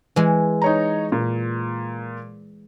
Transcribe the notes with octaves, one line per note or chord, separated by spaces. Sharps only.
E3 G#3
D#4 C#5 A#5
A#2